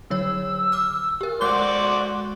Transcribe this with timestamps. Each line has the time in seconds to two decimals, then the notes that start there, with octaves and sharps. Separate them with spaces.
0.10 D3 F#3 C#5 E6
0.72 D6 F6
1.21 G4 A#4
1.41 G#3 F#4 C5 D5 D6 F#6 G7